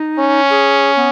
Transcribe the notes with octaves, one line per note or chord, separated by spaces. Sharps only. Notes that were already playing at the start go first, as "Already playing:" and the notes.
Already playing: D#4
C#4
G#4
B3